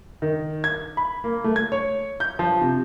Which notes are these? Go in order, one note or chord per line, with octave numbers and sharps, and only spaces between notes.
D#3
G#6
B5
A#3
A3
G#6
C#5
G6
F3
C3